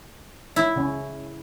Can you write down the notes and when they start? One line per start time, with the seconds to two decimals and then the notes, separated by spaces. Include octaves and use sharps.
0.56 E4
0.76 C#3 C#4